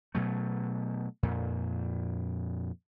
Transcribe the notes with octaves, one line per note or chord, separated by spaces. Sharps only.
B2 F#3 A3
F2 A#2